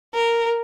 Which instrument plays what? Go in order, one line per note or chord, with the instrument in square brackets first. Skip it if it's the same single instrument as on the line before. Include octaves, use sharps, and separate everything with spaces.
[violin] A#4